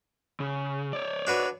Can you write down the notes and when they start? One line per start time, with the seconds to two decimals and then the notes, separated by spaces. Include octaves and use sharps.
0.40 C#3
0.93 C#5 D5
1.27 D4 F#4 B4